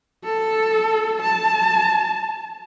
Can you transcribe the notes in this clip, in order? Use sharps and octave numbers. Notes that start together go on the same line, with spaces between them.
A4
A5